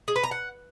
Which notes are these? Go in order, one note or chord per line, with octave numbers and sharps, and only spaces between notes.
G#4
B4
A#5
F#5